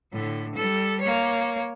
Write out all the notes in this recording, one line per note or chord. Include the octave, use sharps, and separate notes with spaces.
A2 D3
G3 A4
A#3 C#5